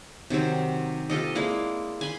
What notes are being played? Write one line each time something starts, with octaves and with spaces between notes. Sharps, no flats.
C3 D#3 F#3 C4
F4 G4 A4 D#5
G#3 A#3 E4 D5
G#5 B5 C6